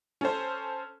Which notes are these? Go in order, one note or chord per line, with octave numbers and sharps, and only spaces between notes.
C#4 A4 C5